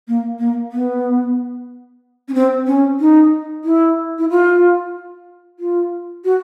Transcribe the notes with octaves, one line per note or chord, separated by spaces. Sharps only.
A#3
A#3
B3
C#4
C4
C#4
D#4
E4
E4
F4
F4
F#4